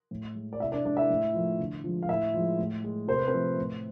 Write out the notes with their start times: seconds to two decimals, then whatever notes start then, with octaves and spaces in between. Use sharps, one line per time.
0.11 A2
0.35 G#3
0.53 D5
0.59 C3 E4 E5
0.72 D4 D5
0.85 G#3 D4 D5
0.97 E4 E5
1.10 A2
1.34 F3 A3
1.59 D3
1.84 F3 G#3
2.03 F5
2.08 A2 E4 E5
2.34 F3 G#3
2.59 A2
2.84 G#3
3.08 C3 C5
3.18 B4
3.28 C4 C5
3.34 F3 A3
3.58 A2